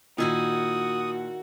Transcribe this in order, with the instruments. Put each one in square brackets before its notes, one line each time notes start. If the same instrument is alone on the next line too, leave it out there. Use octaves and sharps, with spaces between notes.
[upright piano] A#2 [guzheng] D#3 E4 G#5 [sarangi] F#4 [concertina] D#6